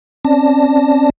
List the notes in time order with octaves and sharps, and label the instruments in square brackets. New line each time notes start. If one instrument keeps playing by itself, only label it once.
[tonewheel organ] C4 C#4 D5 A5 A#6